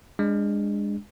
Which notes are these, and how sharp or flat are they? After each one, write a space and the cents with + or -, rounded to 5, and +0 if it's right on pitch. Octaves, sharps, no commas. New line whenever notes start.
G#3 -20 D4 +0